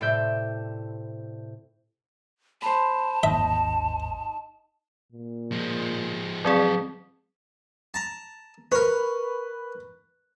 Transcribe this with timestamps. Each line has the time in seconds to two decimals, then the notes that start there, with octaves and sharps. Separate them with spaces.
0.01 A2 C3 D5 E5 G6
2.62 C5 A5 B5
3.23 G#1 D#2 D#4 E5
5.12 A#2
5.52 F3 G#3
6.45 F#3 C4 G#4 D5
7.94 A5 A#5
8.72 A#4 B4 C#5